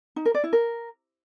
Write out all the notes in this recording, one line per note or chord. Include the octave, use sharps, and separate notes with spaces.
D#4
A#4
D5
E4
A#4